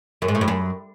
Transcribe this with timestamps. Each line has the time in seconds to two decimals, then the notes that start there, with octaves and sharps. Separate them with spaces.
0.22 F#2
0.28 G#2
0.35 A2
0.41 G2
0.48 F#2